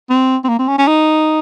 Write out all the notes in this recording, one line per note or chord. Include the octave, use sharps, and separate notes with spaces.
C4
C4
A#3
C4
C#4
C#4
D#4